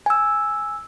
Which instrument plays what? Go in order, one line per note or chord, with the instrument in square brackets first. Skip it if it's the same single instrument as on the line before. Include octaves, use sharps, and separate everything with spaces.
[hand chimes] G#5 E6